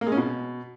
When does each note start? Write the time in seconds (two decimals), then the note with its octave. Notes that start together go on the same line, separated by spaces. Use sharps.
0.01 A#3
0.07 G#3
0.12 C#4
0.17 B2